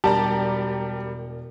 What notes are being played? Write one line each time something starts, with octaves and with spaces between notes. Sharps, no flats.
E1 G3 D4 G4 A#4 D5 A5 A#5